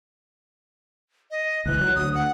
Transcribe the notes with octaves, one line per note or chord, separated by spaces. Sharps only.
D#5
C#2 E3 F#6
F#3
D2 D#6
F#5